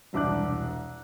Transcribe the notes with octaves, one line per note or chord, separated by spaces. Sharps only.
E1 C2 D4 D6 F#6